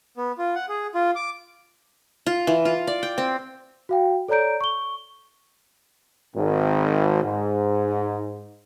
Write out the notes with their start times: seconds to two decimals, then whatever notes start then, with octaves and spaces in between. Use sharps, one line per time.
0.17 B3
0.38 F4
0.55 F#5
0.69 G#4
0.95 F4
1.16 D6
2.26 F4
2.47 E3
2.65 F4
2.87 D5
3.03 G5
3.18 C4
3.89 F#4 F5 G5
4.28 A4 C#5 D5 A#5 G6 D7
4.61 C#6 G7
6.36 G#1
7.23 G#2